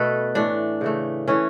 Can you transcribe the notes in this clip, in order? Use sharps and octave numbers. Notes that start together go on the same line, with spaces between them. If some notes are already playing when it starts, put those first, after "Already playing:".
Already playing: B2 A3 A4 B4
A2 E3 A3 D4
C#3 E3 A3
E3 A3 C#4